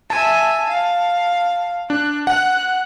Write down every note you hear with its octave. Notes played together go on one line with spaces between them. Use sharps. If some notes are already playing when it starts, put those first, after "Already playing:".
E5 G#5 A5
F5
D4 F#6
F#5 F#6